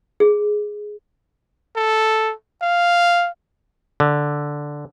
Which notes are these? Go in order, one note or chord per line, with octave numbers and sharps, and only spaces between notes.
G#4
A4
F5
D3